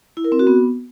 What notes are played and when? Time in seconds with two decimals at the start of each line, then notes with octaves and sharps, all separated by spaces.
0.17 E4
0.24 A#4
0.32 C4
0.39 F#4
0.47 B3